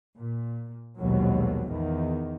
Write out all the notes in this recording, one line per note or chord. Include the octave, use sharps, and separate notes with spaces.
A#2
A#1 D#2 G#2 B2 F#3
E2 D#3